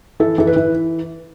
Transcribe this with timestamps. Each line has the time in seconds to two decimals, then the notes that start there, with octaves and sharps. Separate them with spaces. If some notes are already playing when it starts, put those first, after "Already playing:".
0.20 E3 A4
0.38 E3 A4
0.47 B4
0.56 E3